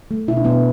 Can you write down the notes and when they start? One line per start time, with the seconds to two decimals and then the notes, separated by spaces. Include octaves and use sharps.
0.11 A3
0.28 B2 E4
0.37 D4
0.44 B2 B3 E4